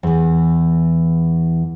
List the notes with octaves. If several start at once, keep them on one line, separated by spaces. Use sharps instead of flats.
E2 E3